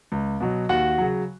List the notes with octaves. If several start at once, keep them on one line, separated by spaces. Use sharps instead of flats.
C#2
B2 F#3
D#2 F#4 F#5
C#3 F#3